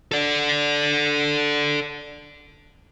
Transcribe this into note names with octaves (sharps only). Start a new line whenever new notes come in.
A4 D5